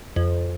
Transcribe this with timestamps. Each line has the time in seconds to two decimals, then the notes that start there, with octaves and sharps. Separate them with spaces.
0.16 F2